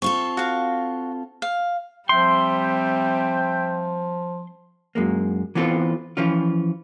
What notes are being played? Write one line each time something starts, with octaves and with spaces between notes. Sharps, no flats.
C4 F4 A4 C#6
F#4 F5
F5
F3 G3 C4 E5 G5 C6
F#2 G#3 A#3
E3 B3 C4 F4 A4
E3 F3 C#4 F4